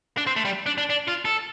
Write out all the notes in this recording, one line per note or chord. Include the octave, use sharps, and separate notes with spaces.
D4
C4
A3
G3
D4
D4
D4
F4
A4